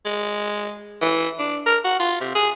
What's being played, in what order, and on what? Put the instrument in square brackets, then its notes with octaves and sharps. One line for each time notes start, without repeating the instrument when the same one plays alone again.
[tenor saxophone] G#3
E3
D4
A#4
F#4
F4
C3
G#4